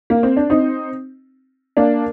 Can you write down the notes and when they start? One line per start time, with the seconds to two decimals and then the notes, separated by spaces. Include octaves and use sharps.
0.10 A#3
0.23 C4
0.37 D4
0.50 C4 D#4
1.77 A#3 D4